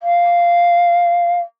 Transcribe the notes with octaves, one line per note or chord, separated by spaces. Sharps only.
F5